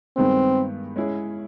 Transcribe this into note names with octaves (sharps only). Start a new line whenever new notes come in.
G2 D#3 G#3 B3 C4
G#3 C#4 E4 G#4